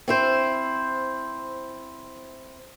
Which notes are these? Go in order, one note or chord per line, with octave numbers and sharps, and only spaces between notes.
C4 E4 C5